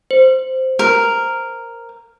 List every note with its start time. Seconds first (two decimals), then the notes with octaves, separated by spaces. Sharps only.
0.11 C5
0.79 A#4